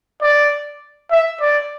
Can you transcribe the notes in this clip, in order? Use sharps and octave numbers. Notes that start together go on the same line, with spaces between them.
D5
E5
D5